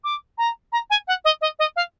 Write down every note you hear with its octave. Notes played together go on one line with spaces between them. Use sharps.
D6
A#5
A#5
G#5
F#5
D#5
D#5
D#5
F5